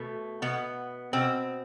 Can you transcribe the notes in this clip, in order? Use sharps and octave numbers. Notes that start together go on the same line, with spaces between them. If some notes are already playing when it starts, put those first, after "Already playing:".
Already playing: B2 A3
B2 B3
B2 C4